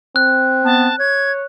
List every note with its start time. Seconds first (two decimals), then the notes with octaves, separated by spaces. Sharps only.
0.16 C4 F#6
0.65 B3 A5
0.99 C#5 G#6